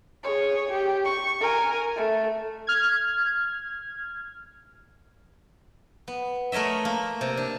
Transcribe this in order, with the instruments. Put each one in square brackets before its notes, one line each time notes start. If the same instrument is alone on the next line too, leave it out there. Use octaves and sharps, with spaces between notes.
[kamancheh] G#4 C#5
G4
C#6
A#4 G#5
A3
[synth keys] F6 G#6
[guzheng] B3
A3 A#4 C#5 D#5 E5
A#3
C3
D4